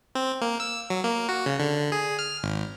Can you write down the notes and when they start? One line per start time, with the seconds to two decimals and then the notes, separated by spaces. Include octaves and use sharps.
0.15 C4
0.41 A#3
0.60 E6
0.90 F#3
1.04 A#3
1.29 F#4
1.46 C#3
1.60 D3
1.92 G#4
2.19 F6
2.43 G#1